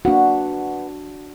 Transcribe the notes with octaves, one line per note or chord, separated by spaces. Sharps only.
A#3 B3 D4 F#4 F#5